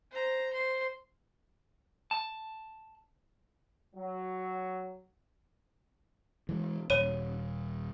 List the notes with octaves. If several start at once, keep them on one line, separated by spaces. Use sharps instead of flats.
C5 A#5
C5 C6
A5
F#3
E3 G#3
D#1 C#5 D#7